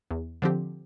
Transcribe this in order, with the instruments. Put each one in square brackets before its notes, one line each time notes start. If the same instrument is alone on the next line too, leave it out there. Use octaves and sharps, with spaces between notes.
[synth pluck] E2
D3 F3 C4 G4